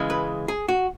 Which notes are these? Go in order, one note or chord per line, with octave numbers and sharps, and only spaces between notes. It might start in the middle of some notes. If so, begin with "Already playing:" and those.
Already playing: C#3 E3 G#3
B4
G#4
F#4